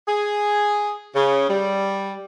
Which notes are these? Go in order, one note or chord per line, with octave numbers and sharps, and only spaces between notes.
G#4
C#3
G3